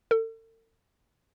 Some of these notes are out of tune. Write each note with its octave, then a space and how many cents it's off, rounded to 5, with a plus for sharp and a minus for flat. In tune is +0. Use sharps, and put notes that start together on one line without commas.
A4 +40